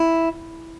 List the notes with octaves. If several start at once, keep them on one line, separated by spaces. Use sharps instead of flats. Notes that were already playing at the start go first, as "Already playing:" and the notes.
Already playing: E4